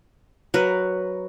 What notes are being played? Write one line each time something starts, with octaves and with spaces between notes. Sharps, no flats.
F#3 A#4 B4